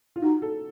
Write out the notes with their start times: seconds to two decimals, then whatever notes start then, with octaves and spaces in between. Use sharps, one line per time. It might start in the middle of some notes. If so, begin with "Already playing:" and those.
0.16 F4
0.21 D#4 F#4
0.42 A4